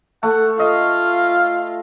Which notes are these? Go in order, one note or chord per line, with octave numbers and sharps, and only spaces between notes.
A3 F#5
F4 D#5 F5